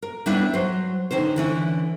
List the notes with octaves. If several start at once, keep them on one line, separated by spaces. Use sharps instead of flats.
A#4
G3 B3 D4 E4 B4 C#5
F#3 C5
D3 D#3 C#4 C5
D3 E3 C#4